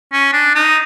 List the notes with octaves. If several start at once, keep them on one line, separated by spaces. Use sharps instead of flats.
C#4
D4
D#4